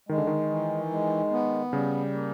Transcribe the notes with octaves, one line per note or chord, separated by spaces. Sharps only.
D#3 G#3
D3
D#3
E3
G#3
B3
C#3 G3
A#3